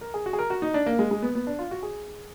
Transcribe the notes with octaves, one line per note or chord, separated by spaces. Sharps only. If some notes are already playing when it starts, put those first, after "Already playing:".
A#4
G#4
F#4
G#4
A#4
F#4
D#4
D4
A#3
G#3
G#3
B3
B3
D4
F4
F#4
G#4